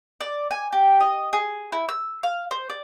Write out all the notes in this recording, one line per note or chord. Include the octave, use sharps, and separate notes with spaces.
D5
G#5
G4
D#5
G#4
E4
E6
F5
C5
D5